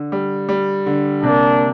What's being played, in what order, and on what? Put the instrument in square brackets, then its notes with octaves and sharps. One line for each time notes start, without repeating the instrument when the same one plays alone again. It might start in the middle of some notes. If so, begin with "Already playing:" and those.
Already playing: [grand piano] D3
G3
G3
D3
[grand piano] C3 [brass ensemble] A#3 D4